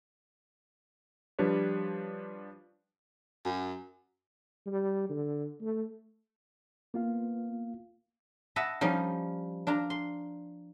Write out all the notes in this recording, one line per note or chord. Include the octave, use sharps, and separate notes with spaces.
F3 G3 D4 G4 B4 C#5
F#2
G3
D3
A3
A#3 B3 F4 F5
D#5 E5 F#5 A5 B5
F3 G3 C#4 D#4
D4 F4 A#5
C6